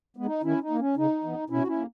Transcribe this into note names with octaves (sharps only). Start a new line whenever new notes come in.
G#3 B3
D#4
D#3 C#4 E4
D#4
A#3
C#4
C#3 D#4
E3 B3
B2 C#4 E4
F#4
C#4 E4
A#3